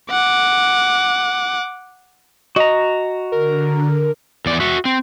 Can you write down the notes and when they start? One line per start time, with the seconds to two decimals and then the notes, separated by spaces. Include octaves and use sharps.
0.11 F#5 D6
2.56 F#4 D#5 A#5
3.32 D3 A#4
4.46 E2 D5
4.60 F#4 E5
4.85 C4